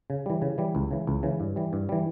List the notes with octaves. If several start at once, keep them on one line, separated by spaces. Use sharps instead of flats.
C#3
E3 G3
C#3
E3 G3
C#2
C#3 E3
C#2
C#3 E3
G2
E3 G3
G2
E3 G3